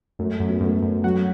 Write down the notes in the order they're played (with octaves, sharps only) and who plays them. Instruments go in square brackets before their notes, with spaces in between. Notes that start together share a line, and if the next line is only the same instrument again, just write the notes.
[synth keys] F#2 [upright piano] A3
[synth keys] F#2
[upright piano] B3
[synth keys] F#2 [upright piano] A3
[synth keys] F#2
[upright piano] F#3 [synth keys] F#4